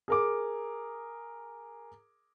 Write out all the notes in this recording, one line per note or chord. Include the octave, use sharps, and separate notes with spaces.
G#4 A#4 D6